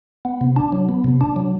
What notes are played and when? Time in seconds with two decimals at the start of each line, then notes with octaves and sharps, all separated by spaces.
0.25 B3
0.41 C3
0.56 D4
0.72 F#3
0.89 B3
1.04 C3
1.21 D4
1.36 F#3